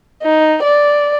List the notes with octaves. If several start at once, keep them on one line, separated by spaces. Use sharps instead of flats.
D#4
D5